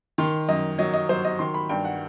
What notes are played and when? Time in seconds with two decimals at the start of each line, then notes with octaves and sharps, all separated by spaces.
0.18 D#3 C6
0.49 F#2 D#5
0.78 F#3 D#5
0.94 D#5
1.09 F#3 C5
1.25 D#5
1.39 D#3 C6
1.54 B5
1.69 G2 G5
1.85 F#5